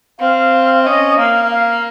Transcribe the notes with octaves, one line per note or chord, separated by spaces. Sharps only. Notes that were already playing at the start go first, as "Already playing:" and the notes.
C4 F5
C#4 D#5
A#3 F5
F5